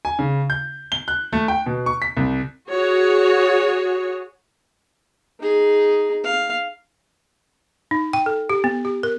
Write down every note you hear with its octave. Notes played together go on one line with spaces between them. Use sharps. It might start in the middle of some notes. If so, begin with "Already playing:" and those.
G#5
C#3
G6
G7
F#6
A3
G5
B2
C#6
B6
C2
F#4 G#4 C#5
D#4 G#4
F5
D#4
G5
A4
G4
B3
G4
A#4